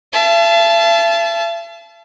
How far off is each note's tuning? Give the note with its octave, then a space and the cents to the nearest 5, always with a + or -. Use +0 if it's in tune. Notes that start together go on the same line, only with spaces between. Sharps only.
E5 +45 A5 -20